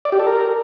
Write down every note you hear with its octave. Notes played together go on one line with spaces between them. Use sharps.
D5
G4
A4
A#4